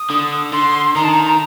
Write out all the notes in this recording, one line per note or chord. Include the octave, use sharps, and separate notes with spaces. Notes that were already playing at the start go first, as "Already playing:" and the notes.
Already playing: D#6
D3
D3 C6
D#3 A#5
A5
A#5